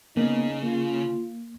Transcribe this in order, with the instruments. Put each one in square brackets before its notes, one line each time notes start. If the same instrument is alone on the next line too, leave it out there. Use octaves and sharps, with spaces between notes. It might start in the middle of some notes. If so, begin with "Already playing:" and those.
[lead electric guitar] C#3 [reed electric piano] A#3 B3 [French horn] D#4
[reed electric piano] A#3 [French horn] F4